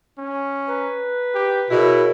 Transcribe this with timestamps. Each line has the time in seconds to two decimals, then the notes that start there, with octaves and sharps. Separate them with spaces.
0.18 C#4
0.68 B4 A#5
1.35 G4
1.70 B2 E4 G#4 A#4 C#5